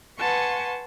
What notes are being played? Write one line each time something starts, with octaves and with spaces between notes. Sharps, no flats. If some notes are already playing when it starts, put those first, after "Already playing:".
B4 F#5 G#5 A5 C6 C#6